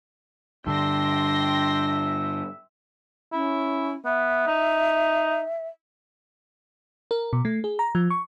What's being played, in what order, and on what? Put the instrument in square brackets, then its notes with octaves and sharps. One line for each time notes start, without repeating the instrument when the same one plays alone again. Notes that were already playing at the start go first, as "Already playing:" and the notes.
[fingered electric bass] G2 D3 [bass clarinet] D4 [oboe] E5 [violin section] G5 C6 A#6
[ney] C#4 [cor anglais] E4
[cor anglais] B3 [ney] E5
[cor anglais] D#4
[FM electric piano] A#4
B2
A3
G#4
A#5
F3
C#6